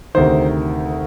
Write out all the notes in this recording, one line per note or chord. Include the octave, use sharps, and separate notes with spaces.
D2 C3 D#3 C5